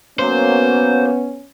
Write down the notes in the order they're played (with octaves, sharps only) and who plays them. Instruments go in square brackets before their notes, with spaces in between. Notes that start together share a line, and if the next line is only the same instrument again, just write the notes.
[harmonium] F#3 A#3 [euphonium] B3 [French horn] C#4 [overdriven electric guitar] C5